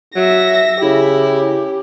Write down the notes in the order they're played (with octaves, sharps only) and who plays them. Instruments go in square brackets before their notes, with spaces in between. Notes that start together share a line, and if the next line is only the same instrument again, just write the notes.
[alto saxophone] F#3 [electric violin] E5 A#6
[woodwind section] C#3 [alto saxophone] E4 [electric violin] G4